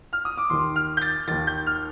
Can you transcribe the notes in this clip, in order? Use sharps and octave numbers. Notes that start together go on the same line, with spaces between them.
F6
D#6
D6
D#2 D#3 C6
F6
G6
A6
D#2 D#3 A6
G6
F6